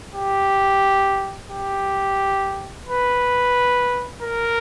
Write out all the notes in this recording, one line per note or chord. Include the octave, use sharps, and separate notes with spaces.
G4
G4
B4
A#4